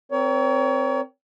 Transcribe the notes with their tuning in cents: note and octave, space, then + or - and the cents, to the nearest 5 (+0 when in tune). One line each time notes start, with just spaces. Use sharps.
C4 -5 A#4 +0 C#5 +30